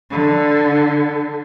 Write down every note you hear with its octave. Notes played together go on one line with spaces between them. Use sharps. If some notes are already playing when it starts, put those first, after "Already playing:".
D3